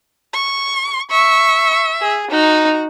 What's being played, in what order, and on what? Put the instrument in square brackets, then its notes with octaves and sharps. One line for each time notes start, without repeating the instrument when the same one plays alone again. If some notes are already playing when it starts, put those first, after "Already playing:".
[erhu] C#6
[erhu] E5 [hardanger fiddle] C#6
[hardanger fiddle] G#4
[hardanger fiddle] D#4 [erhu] F#4